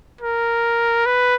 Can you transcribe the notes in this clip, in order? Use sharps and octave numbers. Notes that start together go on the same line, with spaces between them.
A#4
B4